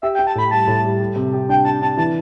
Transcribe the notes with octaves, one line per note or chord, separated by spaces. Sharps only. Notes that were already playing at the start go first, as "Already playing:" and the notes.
G4 E5
G5
G4
A5
A2 B5
G3 A5
A2
G3
G3
C3
G4
D4 G5
D4 A5
D4 A5
E3 A5